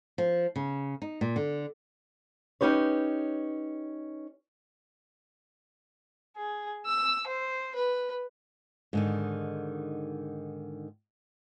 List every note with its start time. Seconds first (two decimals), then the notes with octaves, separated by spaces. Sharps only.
0.18 F3
0.56 C#3
1.02 D#4
1.21 A#2
1.36 D3
2.61 C#4 D#4 G4 B4 C#5
6.37 G#4
6.86 E6
7.27 C5
7.75 B4
8.93 G#2 D3 D#3